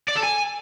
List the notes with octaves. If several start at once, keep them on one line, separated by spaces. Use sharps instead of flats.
D5
A4
G#5